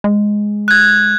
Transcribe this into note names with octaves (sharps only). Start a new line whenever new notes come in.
G#3
F#6 G#6